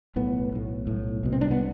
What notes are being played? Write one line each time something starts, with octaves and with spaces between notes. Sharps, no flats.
B1 A2 B3
B1 A2
B1 A2
C2 B2
C4
D4
B3